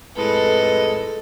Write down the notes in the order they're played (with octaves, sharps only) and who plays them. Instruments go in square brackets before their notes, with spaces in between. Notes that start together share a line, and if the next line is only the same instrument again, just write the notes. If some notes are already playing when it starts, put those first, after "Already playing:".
[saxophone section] F2 A2 G#3 [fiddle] A4 [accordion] B4